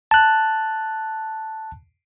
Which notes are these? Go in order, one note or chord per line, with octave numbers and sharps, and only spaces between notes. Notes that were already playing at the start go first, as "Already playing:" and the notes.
A5 F#6